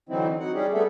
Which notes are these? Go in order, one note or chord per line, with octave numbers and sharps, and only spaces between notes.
D3 E3 F#3 C4 D#4 E4
F#3 D#4 F#5
G3 C#4 G4 G#4
G3 A3 B3 G#4 A4 E5